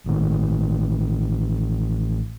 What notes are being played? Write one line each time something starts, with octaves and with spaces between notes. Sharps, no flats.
A1 D#3